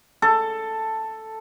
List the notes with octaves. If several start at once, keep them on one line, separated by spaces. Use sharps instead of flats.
A4